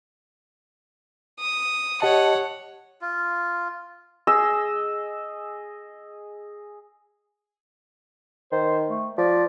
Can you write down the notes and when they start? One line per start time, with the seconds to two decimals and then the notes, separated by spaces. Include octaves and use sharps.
1.40 D#6
2.02 G4 C#5 D#5 F#5 A5
3.01 F4
4.27 G#4 D#5 E6
8.52 D#3 C5
8.89 A3
9.18 F3 D5